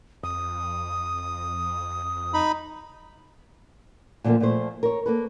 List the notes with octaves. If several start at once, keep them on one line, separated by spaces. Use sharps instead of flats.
F2 D#6
D#4 B5
A#2 D3 F3 A3 A#3
A#2 F3 A3 C5
A#4 C#5
A#3 A4 B4